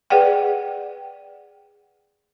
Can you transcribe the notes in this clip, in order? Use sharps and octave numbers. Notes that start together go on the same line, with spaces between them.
G#4 B4 D5 F#5 G5